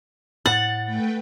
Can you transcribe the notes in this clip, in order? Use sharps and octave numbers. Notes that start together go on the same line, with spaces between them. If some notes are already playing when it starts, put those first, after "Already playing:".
A2 F#5 A6
A3 B4 G5